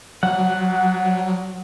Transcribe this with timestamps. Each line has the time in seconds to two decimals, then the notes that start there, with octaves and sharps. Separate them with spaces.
0.23 F#3 F#5